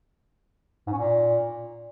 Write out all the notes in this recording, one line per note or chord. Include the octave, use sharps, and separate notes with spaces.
G#2
C#4
A#2